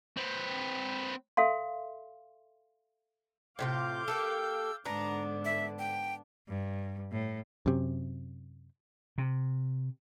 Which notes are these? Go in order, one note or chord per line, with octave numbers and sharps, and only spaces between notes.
C4 B4
A4 E5 F5 C6
A2 C3 F4 F5 D6 G6
A#3 G4 A4 E6
G#2 D3 B3 D4 A#5
E5
G5
G2
A2
F#2 C3
C3